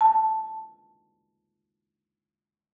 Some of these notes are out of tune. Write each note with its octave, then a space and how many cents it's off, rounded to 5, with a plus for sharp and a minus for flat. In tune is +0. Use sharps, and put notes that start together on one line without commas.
A5 -5